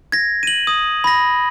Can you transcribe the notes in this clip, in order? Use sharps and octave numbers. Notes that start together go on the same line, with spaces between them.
G#6 A#6
D#7 F#7
D#6
B5 A#6